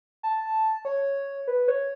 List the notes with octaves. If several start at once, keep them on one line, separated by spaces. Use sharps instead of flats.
A5
C#5
B4
C#5